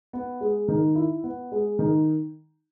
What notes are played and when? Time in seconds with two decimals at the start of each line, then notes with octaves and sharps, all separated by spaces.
0.13 B3
0.41 G#3
0.68 D#3
0.95 E4
1.24 B3
1.52 G#3
1.79 D#3